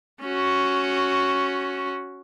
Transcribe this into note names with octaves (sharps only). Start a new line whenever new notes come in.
C#4 F#4